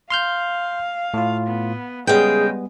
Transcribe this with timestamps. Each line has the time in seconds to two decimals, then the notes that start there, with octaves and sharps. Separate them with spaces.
0.10 F5 C6 F6 G6
1.14 A2 F4
1.47 B3
2.07 C#3 G3 G#3 B3 G#4 G5